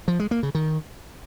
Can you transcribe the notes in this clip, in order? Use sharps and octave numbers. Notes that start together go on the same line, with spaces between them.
F3
G#3
A#3
C#3
D#3